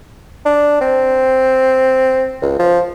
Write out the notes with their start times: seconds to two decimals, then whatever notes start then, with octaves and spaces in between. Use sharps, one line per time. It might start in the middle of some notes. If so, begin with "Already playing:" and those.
0.45 D4
0.81 C4
2.42 C#2
2.59 F3